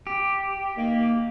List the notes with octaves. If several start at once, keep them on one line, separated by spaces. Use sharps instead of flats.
G4
D#3 A#3